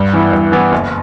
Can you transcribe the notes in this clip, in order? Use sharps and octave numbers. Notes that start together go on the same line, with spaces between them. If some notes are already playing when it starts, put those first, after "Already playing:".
Already playing: G2
E3 B3 E4
G2
E3 B3 E4
F#1